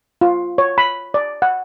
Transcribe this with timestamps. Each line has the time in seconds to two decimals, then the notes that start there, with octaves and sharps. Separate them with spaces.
0.21 F4
0.58 C#5
0.78 B5
1.14 D5
1.42 F#5